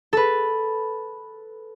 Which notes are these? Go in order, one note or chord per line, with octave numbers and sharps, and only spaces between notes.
A4 B4